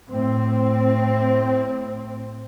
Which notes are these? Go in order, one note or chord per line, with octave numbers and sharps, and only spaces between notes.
A2 C4